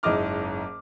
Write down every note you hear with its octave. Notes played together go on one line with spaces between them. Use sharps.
F#1 G#2 E4 D#5 D6 F6